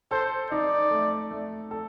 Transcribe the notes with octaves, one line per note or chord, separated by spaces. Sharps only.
A4 C5
D#4 D5
A3
A3
A4